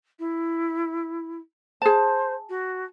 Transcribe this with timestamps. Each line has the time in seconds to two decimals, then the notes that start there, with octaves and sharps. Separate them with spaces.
0.19 E4
1.82 G#4 C5 A5
2.49 F#4